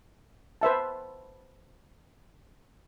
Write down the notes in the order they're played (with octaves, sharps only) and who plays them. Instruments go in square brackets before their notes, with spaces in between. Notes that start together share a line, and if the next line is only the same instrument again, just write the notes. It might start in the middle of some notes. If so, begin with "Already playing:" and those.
[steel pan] B4 C5 E5 A5